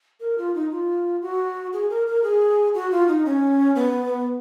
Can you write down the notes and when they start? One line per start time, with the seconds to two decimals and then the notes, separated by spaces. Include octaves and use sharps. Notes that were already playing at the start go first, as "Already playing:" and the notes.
0.20 A#4
0.38 F4
0.55 D#4
0.71 F4
1.22 F#4
1.73 G#4
1.90 A#4
2.07 A#4
2.23 G#4
2.74 F#4
2.91 F4
3.08 D#4
3.26 C#4
3.75 B3